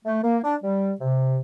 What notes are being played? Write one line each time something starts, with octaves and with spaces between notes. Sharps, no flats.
A3
A#3
D4
G3
C3